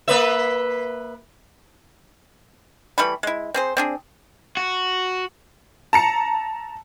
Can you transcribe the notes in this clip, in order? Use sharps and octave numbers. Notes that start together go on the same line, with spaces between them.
A#3 B4 E5
E3 G3 A3 B5
G#3 E4
C4 G#4 C5
C4 D4 G#4
F#4
A5 A#5 C#7